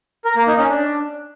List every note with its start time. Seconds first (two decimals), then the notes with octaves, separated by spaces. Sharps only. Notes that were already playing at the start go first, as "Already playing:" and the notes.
0.25 A#4
0.36 A#3
0.47 D#4
0.58 C#4
0.69 D4